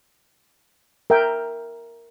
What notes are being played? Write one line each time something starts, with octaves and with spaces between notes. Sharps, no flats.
A#4 E5 G5